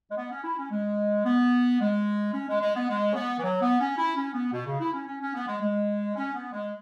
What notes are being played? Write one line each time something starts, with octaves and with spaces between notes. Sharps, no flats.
G#3
B3
C#4
E4
C#4
G#3
B3
G#3
C#4
G#3
G#3
B3
G#3
C#4
B3
E3
F#3
B3
C#4
E4
C#4
B3
B2
C#3
E4
C#4
C#4
C#4
B3
G#3
G#3
C#4
B3
G#3